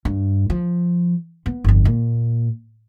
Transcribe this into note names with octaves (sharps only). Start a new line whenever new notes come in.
G2
F3
B3
G1 F2
A#2